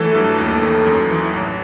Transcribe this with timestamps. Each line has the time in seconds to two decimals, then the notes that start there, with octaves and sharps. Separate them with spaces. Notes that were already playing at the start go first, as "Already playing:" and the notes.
Already playing: E3 F#3 A3 A4
0.15 G2
0.38 D#2
0.62 D#3
0.86 F#2
1.10 E3
1.33 A1